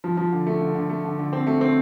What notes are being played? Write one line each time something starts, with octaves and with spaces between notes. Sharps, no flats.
F3
F3
D3
A3
D3
D3
A3
D3
D3
C4
A3
C4